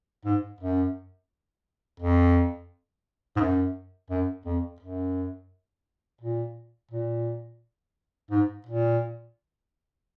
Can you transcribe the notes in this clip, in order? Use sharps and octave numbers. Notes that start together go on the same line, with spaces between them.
G#2
F#2
F2
G#2
F#2
F#2
F2
F#2
A#2
A#2
G#2
A#2